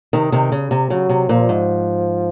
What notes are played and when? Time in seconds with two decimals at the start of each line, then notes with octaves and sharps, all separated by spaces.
0.13 C3 D#3
0.32 C3 D#3
0.52 C#3
0.71 C3
0.90 C#3 F#3
1.09 C3
1.29 A#2 F3
1.49 G#2